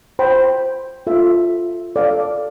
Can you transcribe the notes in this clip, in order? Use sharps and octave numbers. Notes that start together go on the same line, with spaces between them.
C5 G5 B5
F4 A4 E5
A4 D5 F5